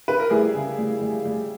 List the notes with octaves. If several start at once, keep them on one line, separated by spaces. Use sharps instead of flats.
B4
A#4
G3 E4 G#4
C#3
G3
G3
G3